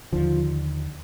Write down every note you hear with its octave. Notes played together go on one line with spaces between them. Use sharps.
D#2 D3 F3